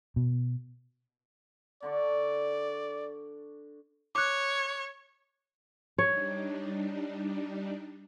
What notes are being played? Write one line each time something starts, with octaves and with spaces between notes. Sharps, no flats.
B2
D3 D4 D5 C#6
C#5 D6 F#6
G3 D4 D#4 C#5